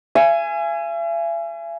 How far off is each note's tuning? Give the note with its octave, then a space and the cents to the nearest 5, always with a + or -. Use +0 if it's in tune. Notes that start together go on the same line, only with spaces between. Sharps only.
E5 +45 G#5 +0